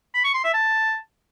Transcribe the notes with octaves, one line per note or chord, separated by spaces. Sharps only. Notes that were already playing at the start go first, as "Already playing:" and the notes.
B5
C#6
C6
E5
A5